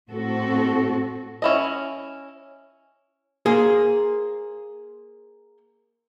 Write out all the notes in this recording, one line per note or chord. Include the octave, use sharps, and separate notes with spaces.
A2 C4 F#4 A4
C#4 E4 D#5
A#3 G#4 C5